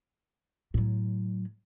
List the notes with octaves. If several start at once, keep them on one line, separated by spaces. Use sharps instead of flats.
A2 F#3